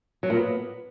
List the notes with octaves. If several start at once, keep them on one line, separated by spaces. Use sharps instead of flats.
F#3
A#2
B3